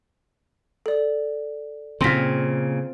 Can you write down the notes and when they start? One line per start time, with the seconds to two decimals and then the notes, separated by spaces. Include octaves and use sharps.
0.86 A4 D5
2.01 A#2 C#3 C4 F4 C6 A#6 B6